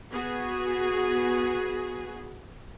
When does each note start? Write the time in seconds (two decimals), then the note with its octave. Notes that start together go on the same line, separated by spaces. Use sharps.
0.12 B3 F#4 G#4